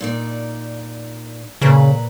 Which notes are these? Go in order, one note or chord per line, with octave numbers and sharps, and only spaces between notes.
A#2 D#4 D5
A#2 C#3 B4 A#5